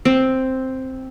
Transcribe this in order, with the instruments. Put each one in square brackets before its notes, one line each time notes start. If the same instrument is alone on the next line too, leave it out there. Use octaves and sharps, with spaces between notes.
[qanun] C4